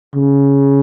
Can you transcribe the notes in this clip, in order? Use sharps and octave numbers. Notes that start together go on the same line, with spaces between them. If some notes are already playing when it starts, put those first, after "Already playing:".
C#3